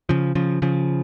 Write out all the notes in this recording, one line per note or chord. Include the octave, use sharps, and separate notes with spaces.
C#3 F3
C#3 F3
C#3 F3